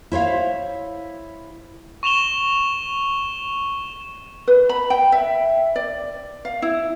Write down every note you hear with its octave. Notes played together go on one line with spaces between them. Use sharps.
E4 C5 C#5 F5
C#6 E7 F7 G7
B4
B5
G5
E5
D5
F5
E4